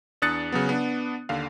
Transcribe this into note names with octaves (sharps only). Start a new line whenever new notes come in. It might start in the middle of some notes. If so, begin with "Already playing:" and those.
E2 D4 D#6 F#6 A6 C#7
C#3 F#3 B3
B3 D4
D#2 D3 F5